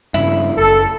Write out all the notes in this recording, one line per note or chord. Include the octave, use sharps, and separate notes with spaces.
G2 C#3 E4
F#1 A4